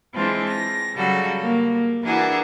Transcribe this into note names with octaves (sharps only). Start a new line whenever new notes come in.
E3 G#3 C4 D4 F4
A#6
C#3 F#3 G3 F#4 A4
A#3
E3 D4 E4 F#4 G#4 A#4